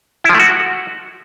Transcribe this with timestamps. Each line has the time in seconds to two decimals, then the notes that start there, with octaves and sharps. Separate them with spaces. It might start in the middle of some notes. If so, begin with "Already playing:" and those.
0.24 E4
0.29 F3
0.34 A3
0.40 F#4